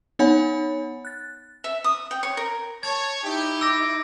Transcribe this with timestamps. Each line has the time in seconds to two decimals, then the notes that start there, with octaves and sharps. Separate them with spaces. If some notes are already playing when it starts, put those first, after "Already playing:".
0.19 B3 D#4 C#5 F#5 G#5 B5
1.05 F#6 A6
1.64 E5
1.84 D#6
2.11 G5
2.23 C#5
2.37 A#4
2.83 C#5 A5 G#6
3.23 D#4 E4 G4
3.61 D6 E6 A#6